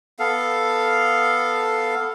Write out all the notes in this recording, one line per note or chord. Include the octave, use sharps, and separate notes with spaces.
B3 A4 F5